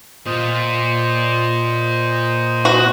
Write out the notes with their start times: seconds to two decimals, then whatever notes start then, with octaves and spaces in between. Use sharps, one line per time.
0.26 A#2 C5 D#5
2.65 F#4